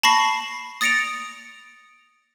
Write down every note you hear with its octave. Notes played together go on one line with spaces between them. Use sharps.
A5 B5 C#6 A#6 C7
D#6 A6 A#6 C#7 D7 F7